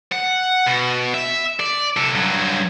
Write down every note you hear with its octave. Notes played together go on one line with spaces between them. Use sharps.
F#5
B2
E5
D5
C3 A4
G2 F#3